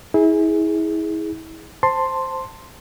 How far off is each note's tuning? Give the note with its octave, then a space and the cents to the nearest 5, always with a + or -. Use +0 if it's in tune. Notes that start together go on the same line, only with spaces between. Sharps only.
E4 -35 G#4 +0
C5 +0 A5 +15 C6 +0